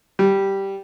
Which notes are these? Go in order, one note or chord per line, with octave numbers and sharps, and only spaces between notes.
G3